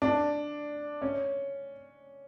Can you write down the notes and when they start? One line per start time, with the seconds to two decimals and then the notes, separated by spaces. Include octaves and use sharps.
0.02 D4
1.02 C#4